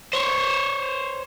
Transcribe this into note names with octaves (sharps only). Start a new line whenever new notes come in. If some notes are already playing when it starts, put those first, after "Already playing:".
C5 C#5